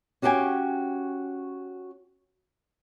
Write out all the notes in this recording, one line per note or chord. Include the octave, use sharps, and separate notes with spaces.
C#4 F#4 G4 F5 G5 G#5